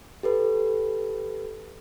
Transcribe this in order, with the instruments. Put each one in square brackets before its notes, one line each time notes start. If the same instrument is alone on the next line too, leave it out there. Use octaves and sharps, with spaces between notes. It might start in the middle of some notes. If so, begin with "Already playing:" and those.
[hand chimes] G4 A4 B4